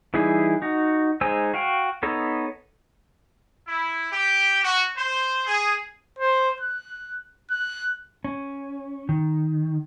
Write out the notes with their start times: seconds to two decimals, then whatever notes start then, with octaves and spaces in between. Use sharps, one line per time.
0.14 E3 G3 D#4 E4 G#4
0.62 D#4 F#4
1.21 G#3 D#4 C5 G#5 E6
1.54 F#4 F5 G5
2.03 B3 D#4 A4 C#5
3.68 E4
4.12 G4
4.64 F#4
4.97 C5
5.47 G#4
6.19 C5
6.61 F#6
7.51 F#6
8.24 C#4
9.09 D#3